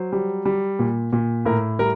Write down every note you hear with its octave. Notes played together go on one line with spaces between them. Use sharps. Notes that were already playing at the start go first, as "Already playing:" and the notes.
Already playing: F#3 C5
G3
G3
A#2
A#2
A2 A#4
G3 A#4